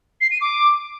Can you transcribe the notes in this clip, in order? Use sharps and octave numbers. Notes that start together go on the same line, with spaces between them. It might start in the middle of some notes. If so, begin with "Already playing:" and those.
C7
D#7
D6